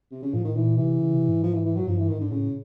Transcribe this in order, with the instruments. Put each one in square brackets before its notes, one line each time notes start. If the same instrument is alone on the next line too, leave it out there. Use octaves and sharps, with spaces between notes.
[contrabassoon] C3
C#3
[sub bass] A2 [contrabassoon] F3
[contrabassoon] D#3
[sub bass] A#2 [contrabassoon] E3
[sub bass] C3 [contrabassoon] E3
[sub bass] C#3
C3
G#2
[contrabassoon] F3
E3
E3
F#3
[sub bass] G2 [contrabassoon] F3
[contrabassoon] E3
[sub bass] G#2 [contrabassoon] D#3
[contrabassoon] D3
[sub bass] A2 [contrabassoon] C#3